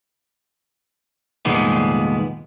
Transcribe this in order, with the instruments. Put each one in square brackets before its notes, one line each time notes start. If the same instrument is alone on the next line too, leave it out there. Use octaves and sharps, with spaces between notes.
[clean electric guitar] C2 F2 A#2 D#3 G#3 B3